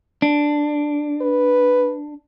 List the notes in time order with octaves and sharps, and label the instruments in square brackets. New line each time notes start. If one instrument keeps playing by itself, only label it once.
[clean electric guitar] D4
[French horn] B4